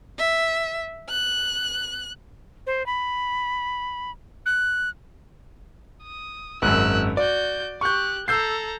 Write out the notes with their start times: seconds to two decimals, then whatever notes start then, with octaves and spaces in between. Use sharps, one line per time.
0.18 E5
1.09 F#6
2.67 C5
2.86 B5
4.46 F#6
6.03 D#6
6.62 G#1 F#2 E6 F#6
7.17 F#4 D5 G6
7.81 G4 C#6 F#6 G6
8.28 A4 A#5 E6 G6 C7